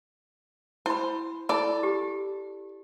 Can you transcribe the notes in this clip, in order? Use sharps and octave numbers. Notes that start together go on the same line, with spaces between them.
E4 C5 B5
E4 A4 D5 B5
G4